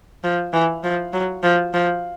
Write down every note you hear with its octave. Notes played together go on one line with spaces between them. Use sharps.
F3
E3
F3
F#3
F3
F3